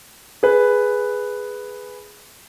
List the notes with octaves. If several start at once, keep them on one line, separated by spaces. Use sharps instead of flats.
G#4 B4